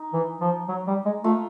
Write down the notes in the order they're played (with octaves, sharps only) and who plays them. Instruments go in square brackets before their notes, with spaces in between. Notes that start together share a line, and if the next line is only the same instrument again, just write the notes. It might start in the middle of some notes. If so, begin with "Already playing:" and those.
Already playing: [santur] D#4
[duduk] E3
F3
F#3
G3
G#3
[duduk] A3 [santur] F4